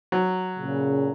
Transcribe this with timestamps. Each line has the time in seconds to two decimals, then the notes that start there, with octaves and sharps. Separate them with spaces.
0.12 F#3
0.58 A#2 C#3